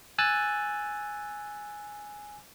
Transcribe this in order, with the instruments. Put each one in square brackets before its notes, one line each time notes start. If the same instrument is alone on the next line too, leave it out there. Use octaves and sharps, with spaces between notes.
[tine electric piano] G#5 E6 F#6 A6